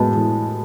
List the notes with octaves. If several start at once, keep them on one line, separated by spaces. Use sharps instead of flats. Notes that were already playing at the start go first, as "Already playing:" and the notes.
Already playing: A2 G#3 B3 F#4 A5
A2